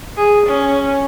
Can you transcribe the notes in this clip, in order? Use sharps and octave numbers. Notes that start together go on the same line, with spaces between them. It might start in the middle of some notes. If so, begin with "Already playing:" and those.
G#4
C#4